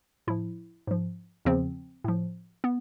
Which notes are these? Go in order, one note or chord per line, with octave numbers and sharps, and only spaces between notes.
A2 F3 E4
G#2 F3
E2 C#3 F3 C4
A2 F3
B3